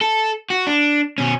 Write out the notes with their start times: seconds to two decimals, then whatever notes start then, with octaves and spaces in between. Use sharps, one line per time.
0.02 A4
0.50 F#4
0.67 D4
1.18 B2 C#4